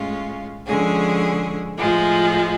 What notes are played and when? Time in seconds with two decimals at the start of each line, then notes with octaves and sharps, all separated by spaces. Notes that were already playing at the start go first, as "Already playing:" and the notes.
Already playing: A2 G#3 C#4 F4
0.66 D3 F3 G#3 C#4 G#4
1.78 A2 F3 G#3